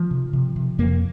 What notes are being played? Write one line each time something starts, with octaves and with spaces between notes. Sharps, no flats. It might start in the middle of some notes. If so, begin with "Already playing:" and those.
Already playing: F3
C3
C3
C3
F2 A#3